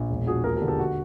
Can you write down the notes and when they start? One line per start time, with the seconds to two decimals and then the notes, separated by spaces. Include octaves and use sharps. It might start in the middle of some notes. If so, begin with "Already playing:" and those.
Already playing: A#1
0.10 E1
0.26 F3 F#4 G#4
0.44 D#2 G#4 A#4
0.56 G4 A4
0.62 D3
0.68 G4 A4
0.79 F#4